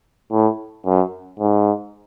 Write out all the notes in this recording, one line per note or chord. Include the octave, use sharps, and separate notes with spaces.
A2
F#2
G#2